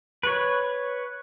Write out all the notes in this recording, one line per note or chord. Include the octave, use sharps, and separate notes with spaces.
B4 C#5